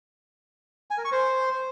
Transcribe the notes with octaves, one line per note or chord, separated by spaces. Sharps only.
G#5
A#4
C#6
C5